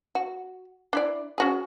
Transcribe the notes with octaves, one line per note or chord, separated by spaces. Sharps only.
F#4
D4 E4 D5
C#4 F#4 G#4